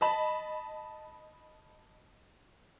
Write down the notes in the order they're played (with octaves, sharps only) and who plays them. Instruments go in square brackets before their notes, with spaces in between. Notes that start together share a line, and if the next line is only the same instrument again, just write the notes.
[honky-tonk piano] D#5 A5 B5